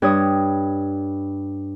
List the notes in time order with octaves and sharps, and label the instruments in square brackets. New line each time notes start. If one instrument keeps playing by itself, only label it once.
[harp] G2 C#5 D#6